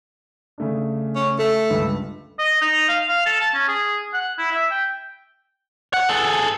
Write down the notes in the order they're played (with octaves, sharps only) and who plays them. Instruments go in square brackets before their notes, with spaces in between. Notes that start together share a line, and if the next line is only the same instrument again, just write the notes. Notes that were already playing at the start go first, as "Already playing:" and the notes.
[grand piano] C#3 A3 D4
[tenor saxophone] C#4
[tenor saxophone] A3 [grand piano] A4
[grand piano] C#2 G2
[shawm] D#5
D#4
F5
F5
A4
A5
C#4
G#4
F#5
E4
E5
G5
[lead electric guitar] F#5
G#4 A4